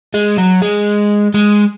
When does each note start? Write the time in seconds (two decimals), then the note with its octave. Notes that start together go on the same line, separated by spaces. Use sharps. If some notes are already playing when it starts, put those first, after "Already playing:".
0.14 G#3
0.38 F#3
0.62 G#3
1.34 G#3